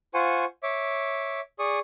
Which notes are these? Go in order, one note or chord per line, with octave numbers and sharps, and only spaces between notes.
F4 C5 F#5 G#5 C#6
C#5 E5 D6
G#4 D5 C#6 D#6